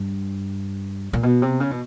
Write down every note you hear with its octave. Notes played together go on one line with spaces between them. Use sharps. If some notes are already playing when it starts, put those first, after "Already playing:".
Already playing: G2
A#2
B2
C3
C#3
B2